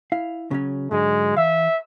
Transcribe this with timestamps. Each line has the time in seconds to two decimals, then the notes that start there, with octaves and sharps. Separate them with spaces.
0.12 E4 F5
0.51 C#3 F#3 C#4
0.91 G#2 D3 F#3 G#3
1.36 E3 E5 F5